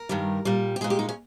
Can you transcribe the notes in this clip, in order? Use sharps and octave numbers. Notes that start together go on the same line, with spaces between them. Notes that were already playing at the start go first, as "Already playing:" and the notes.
Already playing: A#4
G2 D#3 G3
A#2 G3
G4
A#2 G#3 G#4
G4
D#4
C#4